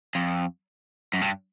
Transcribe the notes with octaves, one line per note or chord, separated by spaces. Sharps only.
F2
F#2
G2